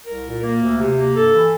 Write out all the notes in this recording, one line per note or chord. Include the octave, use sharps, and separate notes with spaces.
C2 A#4
A#2
A#3
D2
C3
A#3
G2 A4
E3